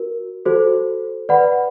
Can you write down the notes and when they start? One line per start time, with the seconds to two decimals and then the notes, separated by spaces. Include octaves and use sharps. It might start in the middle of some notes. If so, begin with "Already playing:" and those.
Already playing: F#4 A#4
0.46 F#4 A4 C5
1.29 B4 D5 F#5 B5